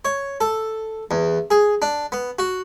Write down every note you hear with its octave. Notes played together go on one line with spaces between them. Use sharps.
C#5
A4
E2
G#4
D4
B3
F#4